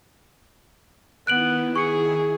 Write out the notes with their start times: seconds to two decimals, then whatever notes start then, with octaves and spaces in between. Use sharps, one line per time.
1.27 D#3 B3 E4 F#6 D7 F#7
1.76 G#4 C#6 C#7